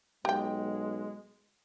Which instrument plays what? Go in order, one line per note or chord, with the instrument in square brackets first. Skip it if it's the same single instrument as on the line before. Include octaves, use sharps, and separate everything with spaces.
[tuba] B1 [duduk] G#3 [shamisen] G4 G5